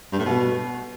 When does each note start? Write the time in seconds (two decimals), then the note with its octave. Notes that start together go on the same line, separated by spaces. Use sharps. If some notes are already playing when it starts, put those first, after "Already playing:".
0.12 G2
0.19 A2
0.25 B2